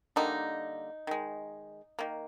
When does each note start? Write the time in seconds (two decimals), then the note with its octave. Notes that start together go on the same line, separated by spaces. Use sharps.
0.16 D3 G3 A#3 D#4
1.07 D#3 G#3
1.99 D#3 A#3